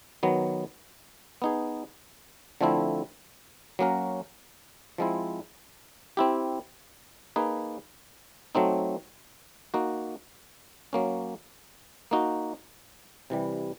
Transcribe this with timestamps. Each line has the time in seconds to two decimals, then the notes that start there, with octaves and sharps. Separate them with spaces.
0.23 D#3 F#3 B3
1.42 B3 D#4 G#4
2.61 D3 F3 A3 C4 E4
3.79 F#3 A#3 C#4 F#4 A#4
4.98 F3 G#3 C4 E4
6.17 C4 E4 G4
7.36 A#3 D#4 G#4 B4
8.55 F#3 A3 C4 D#4
9.74 A#3 D#4 F#4
10.93 F#3 A#3 C#4
12.11 A#3 D#4 F#4
13.30 C3 E3 G3